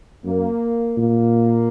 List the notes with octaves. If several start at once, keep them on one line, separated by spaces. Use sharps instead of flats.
F#2 A#3
A#2 A#3